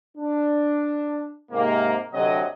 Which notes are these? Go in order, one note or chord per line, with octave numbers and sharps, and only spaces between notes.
D4
G#2 C3 A#3
D2 C3 F#3 D#5